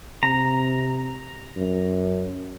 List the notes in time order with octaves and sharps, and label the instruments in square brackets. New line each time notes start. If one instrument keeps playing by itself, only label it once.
[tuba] C3 [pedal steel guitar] A#5
[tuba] F#2